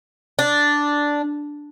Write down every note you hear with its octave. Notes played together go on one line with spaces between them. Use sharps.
D4